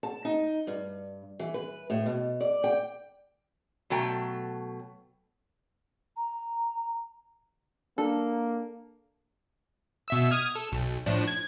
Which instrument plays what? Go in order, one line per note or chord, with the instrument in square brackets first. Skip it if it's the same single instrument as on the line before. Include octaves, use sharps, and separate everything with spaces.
[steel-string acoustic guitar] A5
D#4
G2
E3
B4
A2
B2
D5
G5
[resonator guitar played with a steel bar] B2 F#3 A3 G5
[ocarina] A#5
[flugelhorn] A#3 [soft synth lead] D4 [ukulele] A4
[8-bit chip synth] B2 E5 E6
D#6 F6 G#6
A4
B1
A2 F3 D4
G#6